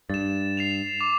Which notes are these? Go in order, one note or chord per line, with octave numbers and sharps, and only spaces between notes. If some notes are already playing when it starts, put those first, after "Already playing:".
G2 A6 E7
C7 E7 F7
D6